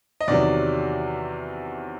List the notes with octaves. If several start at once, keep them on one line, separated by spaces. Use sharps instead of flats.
D#5
E2 C3 D#3 F#3 D5